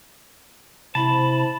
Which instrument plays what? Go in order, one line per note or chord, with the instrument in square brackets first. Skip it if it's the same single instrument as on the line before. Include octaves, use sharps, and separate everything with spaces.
[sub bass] C3 [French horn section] E4 C5 [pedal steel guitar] A5 [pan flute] B5